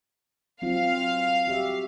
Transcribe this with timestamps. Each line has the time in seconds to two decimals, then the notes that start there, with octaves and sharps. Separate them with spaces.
0.62 F#3 C4 F4 F5
1.47 F#4 G4 E5